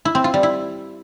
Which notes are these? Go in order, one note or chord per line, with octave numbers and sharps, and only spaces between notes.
E4
C4
F4
G3
E4